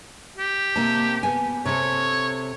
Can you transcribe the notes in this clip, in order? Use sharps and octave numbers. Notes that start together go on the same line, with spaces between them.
G4
C3 A#3 A5
B3 G#5
C3 A4 C#5